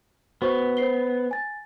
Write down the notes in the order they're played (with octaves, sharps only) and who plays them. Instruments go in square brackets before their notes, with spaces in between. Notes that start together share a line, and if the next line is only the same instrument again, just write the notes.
[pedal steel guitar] B3 [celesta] F#4 C5 C#6
[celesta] C5 C7 G7
G#5 A6